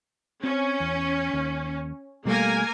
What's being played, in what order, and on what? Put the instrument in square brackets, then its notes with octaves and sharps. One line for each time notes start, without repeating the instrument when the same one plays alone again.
[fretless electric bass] C4 [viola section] C#4
[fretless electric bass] E2
D#2
[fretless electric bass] B2 G3 A3 [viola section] A#3 A#4 G#5